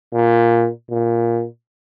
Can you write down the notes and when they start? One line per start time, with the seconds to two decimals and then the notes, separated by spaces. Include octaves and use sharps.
0.14 A#2
0.91 A#2